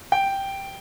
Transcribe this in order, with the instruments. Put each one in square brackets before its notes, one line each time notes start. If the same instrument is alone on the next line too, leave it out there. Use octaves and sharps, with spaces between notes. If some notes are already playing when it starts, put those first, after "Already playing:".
[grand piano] G5